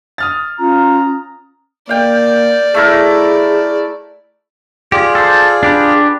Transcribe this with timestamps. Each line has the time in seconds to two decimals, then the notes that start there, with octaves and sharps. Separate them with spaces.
0.18 D#6 F6 A6
0.59 C#4 F4 A#5
1.89 A#3 D5 F5 G5
2.74 A3 E4 G#4 A#4
4.92 F4 G4 G#4 D5
5.15 A4 C5
5.63 D4 G4 B4